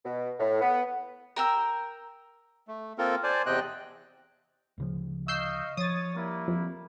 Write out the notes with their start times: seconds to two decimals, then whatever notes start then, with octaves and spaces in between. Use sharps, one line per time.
0.05 B2
0.39 A2
0.61 B3
1.36 A#4 G5 E6
2.68 A3
2.98 A#3 C4 F4 A4 A#4
3.24 C5 D5 G#5 A5
3.46 E2 C3 C4 D#5 G5 F#6
4.78 D2 C#3 F3
5.28 D#5 F5 C#6 E6 G6 C7
5.77 F3 C#5 D#6 A6
6.15 G3 A#3 E4
6.48 F2